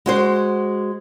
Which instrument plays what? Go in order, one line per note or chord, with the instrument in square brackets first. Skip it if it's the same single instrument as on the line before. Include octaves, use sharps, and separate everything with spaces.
[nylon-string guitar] G#3 F#4 C5